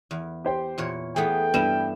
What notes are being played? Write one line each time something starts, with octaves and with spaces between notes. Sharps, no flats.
E2
G4 C5 G5
E2 A#2 C#5
E3 A3 B3 G#4 G5
G2 G3 B3 E4 E7